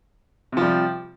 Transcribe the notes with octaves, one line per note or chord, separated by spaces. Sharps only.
C3 F3 G3